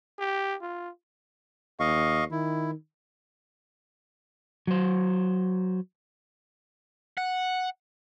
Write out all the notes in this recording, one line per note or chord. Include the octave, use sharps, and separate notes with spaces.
G4
F4
D#2 D#5 F5 C#6
D#3 E4
F#3 C5
F#5